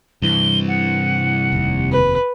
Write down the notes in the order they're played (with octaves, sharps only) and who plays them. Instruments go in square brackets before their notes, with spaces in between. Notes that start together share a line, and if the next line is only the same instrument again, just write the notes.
[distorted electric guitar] C2 [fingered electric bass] G2 E3 [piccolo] G7
[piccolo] F#5
[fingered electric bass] F1 D#2 C3
[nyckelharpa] B4